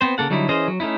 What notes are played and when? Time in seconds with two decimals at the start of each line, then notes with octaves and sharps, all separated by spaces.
0.01 B3 C4 C5
0.18 C#3 A#3 A4 F#5
0.30 D3 F#3 G3 D#4 E4
0.49 E3 C#4 G#4 C5 D#5
0.68 F#3
0.80 A3 C#4 D#4 E4